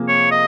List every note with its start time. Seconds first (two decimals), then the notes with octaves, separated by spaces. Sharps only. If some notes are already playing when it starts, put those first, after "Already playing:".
Already playing: C3 F3 A#3 G#4
0.09 C#5
0.31 D#5